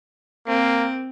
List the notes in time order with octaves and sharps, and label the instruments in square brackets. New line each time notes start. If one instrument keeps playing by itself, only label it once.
[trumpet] A#3 [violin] C4